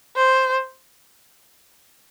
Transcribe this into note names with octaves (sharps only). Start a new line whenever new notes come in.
C5